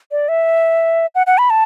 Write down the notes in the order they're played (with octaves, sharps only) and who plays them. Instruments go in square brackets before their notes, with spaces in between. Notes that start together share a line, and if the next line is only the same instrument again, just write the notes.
[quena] D5
E5
F#5
F#5
B5
A5